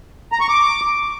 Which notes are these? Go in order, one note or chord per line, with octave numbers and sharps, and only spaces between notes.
A#5
C#6
D6